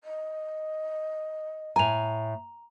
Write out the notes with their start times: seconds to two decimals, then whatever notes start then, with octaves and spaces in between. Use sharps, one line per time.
0.04 D#5
1.76 A2 G#5 A#5 F7